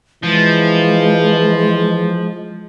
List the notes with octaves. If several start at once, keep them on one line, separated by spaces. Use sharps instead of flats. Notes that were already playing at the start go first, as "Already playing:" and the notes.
E3 F3 G#3